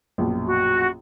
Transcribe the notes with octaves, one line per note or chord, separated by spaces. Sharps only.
A#1 F#2 B2
F#4